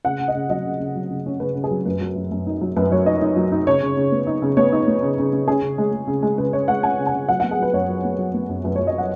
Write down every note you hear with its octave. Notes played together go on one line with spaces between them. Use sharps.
C#3 F#5
C#3
D#5
C#3
F#3 D#5
C#3
C#3
F#3
C#3
C#4
C#3 B4
C#3
G#4
F#3
F#2 B4
F#3
F#2
F#2
D#4
F#3
F#2 B4
F#3 C#5
D#4 D#5
D#4
F#3
D#4
C#3 C#5
C#3
C#3
B3
D#4
C#3
B3 C#5
D#4
B3
C#3
C#3
C#3
C#4 G#4
C#3
G#3
G#3
C#3
G#3
C#3 B4
C#4 C#5
G#3 F#5
C#4 G#5
C#3
G#5
C#3
F#3 F#5
B3 F#5
G#4
F#3 B4
F#2 C#5
F#3
B3
F#3
B3
F#2
F#2 B4
F#3 C#5
D#5
F#5